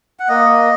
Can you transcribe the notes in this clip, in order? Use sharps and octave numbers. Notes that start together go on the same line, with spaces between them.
F#5
A#3 D#5